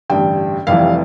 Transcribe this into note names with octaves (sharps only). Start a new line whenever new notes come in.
A1 G2 D3 G5
F1 F2 E3 G3 F5